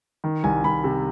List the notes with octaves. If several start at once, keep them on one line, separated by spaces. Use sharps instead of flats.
D#3
C2 G#5
C2 B5
C3